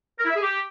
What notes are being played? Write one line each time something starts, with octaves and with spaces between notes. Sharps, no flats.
A#4
E4
E5
G#4
G4